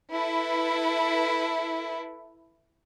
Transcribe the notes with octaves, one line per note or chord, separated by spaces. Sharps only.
E4 A4 B4